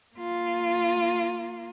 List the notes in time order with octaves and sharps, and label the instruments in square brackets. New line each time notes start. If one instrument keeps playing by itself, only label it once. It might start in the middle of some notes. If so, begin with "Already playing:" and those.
[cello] A#3 F4